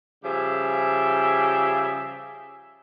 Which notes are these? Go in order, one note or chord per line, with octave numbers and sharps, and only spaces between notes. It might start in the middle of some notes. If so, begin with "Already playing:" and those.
C#3 F3 G3 G#4 E5